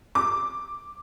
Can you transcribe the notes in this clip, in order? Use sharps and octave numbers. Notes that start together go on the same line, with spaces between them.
D6